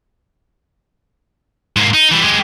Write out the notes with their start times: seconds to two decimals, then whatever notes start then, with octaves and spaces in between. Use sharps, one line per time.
1.76 G#2 A#3
1.94 D#4
2.11 E3 G3
2.23 G#3 G4